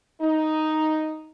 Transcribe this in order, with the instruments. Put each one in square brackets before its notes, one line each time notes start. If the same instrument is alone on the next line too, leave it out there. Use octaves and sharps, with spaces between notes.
[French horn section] D#4